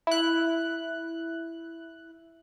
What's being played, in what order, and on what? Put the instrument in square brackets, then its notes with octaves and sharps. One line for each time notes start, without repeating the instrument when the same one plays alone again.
[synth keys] E4 F#6